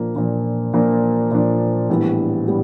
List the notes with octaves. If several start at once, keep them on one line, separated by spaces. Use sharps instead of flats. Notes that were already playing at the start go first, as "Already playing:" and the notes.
Already playing: A#2 F3 A#3 D4
A#2 F3 A#3 D4
A#2 F3 A#3 D4
A#2 F3 A#3 D4
A#1 A2 E3 G3 B3
A2 E3 G3 B3